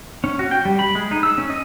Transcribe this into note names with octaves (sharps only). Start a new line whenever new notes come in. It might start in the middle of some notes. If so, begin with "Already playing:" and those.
C#4
F#4
G5
G3
B5
G#3
D#4
E6
C#4
D#5